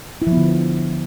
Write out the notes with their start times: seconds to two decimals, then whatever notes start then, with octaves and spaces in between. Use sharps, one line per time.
0.22 E4
0.27 F3
0.32 B3
0.37 D3